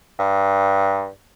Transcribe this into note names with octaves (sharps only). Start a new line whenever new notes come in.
G2